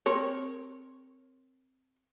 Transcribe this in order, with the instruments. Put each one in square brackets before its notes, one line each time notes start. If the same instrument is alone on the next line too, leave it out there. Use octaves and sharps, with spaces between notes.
[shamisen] C4 A#4 C#5